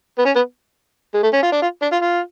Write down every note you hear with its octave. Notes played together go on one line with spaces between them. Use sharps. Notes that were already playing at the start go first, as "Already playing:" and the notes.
B3
C#4
B3
G#3
A3
C#4
F4
D4
F4
D4
F4
F4